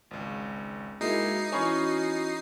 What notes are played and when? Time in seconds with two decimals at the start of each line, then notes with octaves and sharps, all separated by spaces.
0.11 G#1 C#2
1.01 G#3 A#3 D#4 E4 F#4 C7
1.52 E3 C#4 F#4 C#5 G#5 B5 C#6